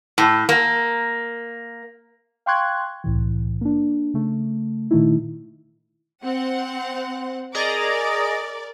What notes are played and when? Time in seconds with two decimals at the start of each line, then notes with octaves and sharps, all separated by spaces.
0.18 A2
0.49 A#3
2.46 F5 G5 C6 C#6 F#6 G#6
3.04 C2 A2 E3
3.61 A#3 D4
4.14 C#3 A3
4.91 A#2 D#3 A3 D#4 E4
6.22 C4 F#5
7.55 G#4 A#4 D5 D#5 A#5